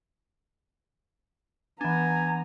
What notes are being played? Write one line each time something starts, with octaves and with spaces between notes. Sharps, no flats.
E3 B3 D4 G#5 A#5